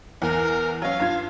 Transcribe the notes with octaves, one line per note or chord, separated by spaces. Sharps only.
E2 A#4
F#3 C#4 F5
G2 F4 G#6